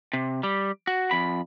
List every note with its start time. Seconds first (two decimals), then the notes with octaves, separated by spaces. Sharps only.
0.13 C3
0.43 G3
0.87 F#4
1.11 F2 B5